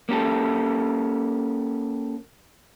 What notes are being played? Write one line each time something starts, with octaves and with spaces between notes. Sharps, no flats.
A#3 C#4 G4 A4